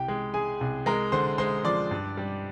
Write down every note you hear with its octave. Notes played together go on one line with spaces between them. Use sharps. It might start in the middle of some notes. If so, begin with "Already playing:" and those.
Already playing: C2 G4 G5
G#3
G#3 G#4 G#5
C2
G#3 A#4 A#5
D3 C5 C6
G#3 C5 C6
F3 D5 D6
G2
G3